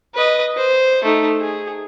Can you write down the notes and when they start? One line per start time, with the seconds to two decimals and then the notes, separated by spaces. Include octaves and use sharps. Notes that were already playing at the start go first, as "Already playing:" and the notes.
0.15 B4 D#5
0.56 C5
1.04 A3 D#4
1.40 G#4